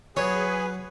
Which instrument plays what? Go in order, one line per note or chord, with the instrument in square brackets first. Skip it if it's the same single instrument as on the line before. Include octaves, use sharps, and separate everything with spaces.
[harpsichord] F#3 [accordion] G#4 G#5 [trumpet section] B4 [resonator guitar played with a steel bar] C#5